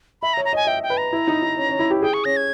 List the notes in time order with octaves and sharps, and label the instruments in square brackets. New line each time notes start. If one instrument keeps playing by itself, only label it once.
[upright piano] E5 [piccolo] B5
[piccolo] A#5
[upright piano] C#5
[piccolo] A#5
[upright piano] D#5 [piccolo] G#5
[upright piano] E5 [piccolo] G5
[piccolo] G5
[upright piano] B4
[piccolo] A#5
[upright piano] E4
D#4
D#4
C#4
C#4
E4
G4
[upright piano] G#4 [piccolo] G5
[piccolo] C#6
[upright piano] C#4 [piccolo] A#6
[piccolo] G#6